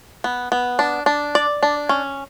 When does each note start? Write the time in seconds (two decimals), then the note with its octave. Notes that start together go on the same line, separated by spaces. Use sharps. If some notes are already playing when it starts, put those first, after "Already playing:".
0.24 B3
0.52 B3
0.79 D4
1.06 D4
1.35 D5
1.63 D4
1.89 C#4